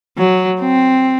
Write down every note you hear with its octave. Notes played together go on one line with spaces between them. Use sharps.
F#3
C4